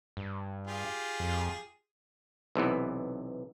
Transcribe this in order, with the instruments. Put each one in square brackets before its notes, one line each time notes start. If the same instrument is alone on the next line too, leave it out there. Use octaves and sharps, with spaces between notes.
[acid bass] G2
[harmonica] F4 G4 G#4
[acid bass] F2
[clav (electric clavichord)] B1 C3 E3 B3